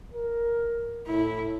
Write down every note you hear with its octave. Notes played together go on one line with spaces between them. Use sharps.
A#4
A2 E4